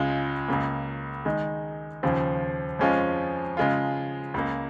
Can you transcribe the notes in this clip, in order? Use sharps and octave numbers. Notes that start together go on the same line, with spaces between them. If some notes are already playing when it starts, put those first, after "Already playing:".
Already playing: C#2 C#3 G#3 F4 G#4
C#2 C#3 A#3
D#3 G#3 D#4
D#2 C#3 F3
F2 F3 G#3 C#4 F4
C#3 G#3 F4
C#2 C#3 A#3